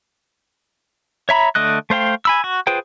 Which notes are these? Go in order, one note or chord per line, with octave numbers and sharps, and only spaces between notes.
C#5 E5 A#5 B5
D3 A3 D#5 F#6
A3 C5 F5 G5
G#5 B5 E6
F#4
F4 G#4 B4 C5 G5